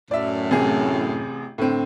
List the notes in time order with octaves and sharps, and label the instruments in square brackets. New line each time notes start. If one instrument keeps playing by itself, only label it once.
[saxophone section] F#2 A2 [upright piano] D5 E5
[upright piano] A1 C3 G#4
A2 D3 C4